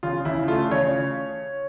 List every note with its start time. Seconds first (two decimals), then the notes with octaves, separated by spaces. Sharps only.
0.03 C#3 F4
0.25 C#3 E4
0.48 A3 F4
0.71 C#3 C#5